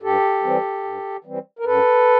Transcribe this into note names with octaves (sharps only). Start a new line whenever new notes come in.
G2 G4 A4
E3 G3 C4
G2
E3 G3 C4
A#4
F#2 A4 B4